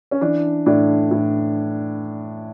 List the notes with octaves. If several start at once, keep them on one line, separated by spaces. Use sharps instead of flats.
C#4
E3 D4
A2 D4
A2